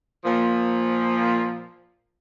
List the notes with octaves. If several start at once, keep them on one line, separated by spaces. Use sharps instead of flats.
A#2 F3